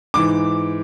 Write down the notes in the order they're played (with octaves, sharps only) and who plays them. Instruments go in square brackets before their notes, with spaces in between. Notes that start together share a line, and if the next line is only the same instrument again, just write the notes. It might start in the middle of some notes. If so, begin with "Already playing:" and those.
[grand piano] G#2 E3 D6